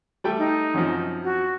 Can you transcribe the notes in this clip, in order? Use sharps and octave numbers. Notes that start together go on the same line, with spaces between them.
G3 A3 G5
D#4
F#2 C3 F3
F#4